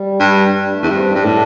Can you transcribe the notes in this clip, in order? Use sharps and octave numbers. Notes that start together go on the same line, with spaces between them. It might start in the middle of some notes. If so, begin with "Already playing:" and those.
Already playing: G3
G2
G3
A3
E2
G2 C4
D4
G2
A2